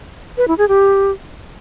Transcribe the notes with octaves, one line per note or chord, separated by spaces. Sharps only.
B4
E4
G#4
G4